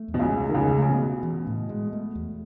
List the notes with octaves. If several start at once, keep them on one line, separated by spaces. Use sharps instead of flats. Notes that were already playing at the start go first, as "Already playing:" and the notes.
Already playing: A3
E2
B2
C#2 C#3
A3
D#3
C#2 C#3 C#4
C#3 A3
B2
A3
E3
A2
G#3
A3
E2